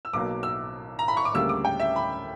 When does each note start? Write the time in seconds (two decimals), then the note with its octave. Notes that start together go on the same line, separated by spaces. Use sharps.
0.05 E6
0.13 B1 B2 F#3 A#3 D6
0.43 E6
0.99 A#5
1.08 B5
1.17 C#6
1.25 D6
1.34 D2 C#3 G3 A#3 E6
1.49 D6
1.65 G5
1.80 E5
1.96 B5